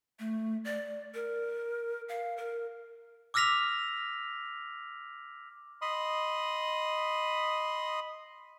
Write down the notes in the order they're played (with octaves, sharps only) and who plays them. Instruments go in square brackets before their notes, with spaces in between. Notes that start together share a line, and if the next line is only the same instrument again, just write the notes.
[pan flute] A3
D5
A#4
F5
A#4
[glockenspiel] D6 E6 F6 A#6 B6 F7
[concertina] D#5 B5 C6 D#6